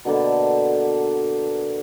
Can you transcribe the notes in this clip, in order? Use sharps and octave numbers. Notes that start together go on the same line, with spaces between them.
B2 D3 A#3 A5